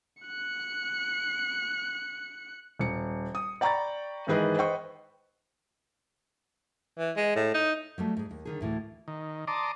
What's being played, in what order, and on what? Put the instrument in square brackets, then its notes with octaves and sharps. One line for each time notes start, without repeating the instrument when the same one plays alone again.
[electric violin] F#6 C#7
[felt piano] D#1 C#7
D#6
D5 G5 A#5 B5 C#6 A6
G#2 D#3 E3 G#4 B4 D#5
B4 C5 D#5 G5 C#6
[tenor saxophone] E3
G#3
A2
D#4
[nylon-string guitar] F#3 G3 A3
G#2 G#4
D#2
D3 D#3 G#4
D2 A2 E3
[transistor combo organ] D#3
D5 A5 A#5 C6 D6 D#6